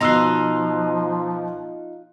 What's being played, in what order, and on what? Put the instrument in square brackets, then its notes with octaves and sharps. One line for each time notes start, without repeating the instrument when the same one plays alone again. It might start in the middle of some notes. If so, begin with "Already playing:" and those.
[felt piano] B2 E6 F#6 [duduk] F3 [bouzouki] D#4 F4 [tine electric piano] A#5 C6